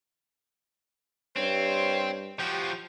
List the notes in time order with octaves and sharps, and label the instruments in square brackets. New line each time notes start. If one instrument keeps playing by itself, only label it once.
[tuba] G2 [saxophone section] G3 C5 C#5 [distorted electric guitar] C4
[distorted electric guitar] F3 F#4 [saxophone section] G4